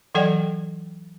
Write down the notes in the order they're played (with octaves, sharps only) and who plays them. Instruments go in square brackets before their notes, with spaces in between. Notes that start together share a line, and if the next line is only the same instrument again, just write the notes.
[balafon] E3 F#3 A4 D5 F#5 G5